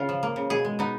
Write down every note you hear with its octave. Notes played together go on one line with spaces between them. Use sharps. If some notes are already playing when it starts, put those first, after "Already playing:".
Already playing: C#3 F4
F3
A#3
C#3
B2 G#4
G#3
B3 D#4